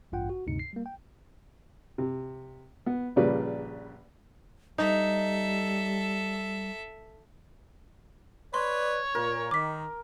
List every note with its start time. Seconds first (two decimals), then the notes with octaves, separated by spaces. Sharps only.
0.12 A1 G2 F4 F#5 G5
0.30 F#4
0.47 D2 G2 C3 D#4 C#7
0.59 C7
0.73 G3 A#3
0.86 G5
1.98 C3
2.86 B3
3.16 A#1 A#2 C#3 G3 B4 D5
4.78 G3 D#4 A4 E5
8.54 B4 C#5 D5 C6
9.15 A#2 A#4
9.51 D#3 D6 B6